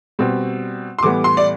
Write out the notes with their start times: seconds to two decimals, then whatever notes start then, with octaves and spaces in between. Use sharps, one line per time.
0.19 B2 G3 C4
0.99 C6
1.03 A2 E3 G3 B3 D6
1.24 C6
1.37 D5